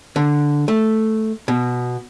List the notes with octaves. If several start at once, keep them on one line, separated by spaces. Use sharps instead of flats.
D3
A3
B2